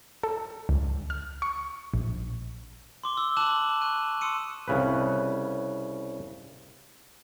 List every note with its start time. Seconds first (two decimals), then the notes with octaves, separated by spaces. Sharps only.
0.23 A4
0.69 C#2
1.10 F6
1.42 C#6
1.94 A#1
3.04 C6 D6 G7
3.17 E6
3.37 A5 D6 F#6 E7 F#7
3.81 C#6 F#6 D#7
3.98 E7
4.21 C6 D#6 E6 C#7 D#7
4.68 C2 C#3 B4